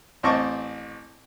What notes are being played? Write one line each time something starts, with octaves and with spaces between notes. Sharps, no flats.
A1 C4 D#5 A5 C#6 D6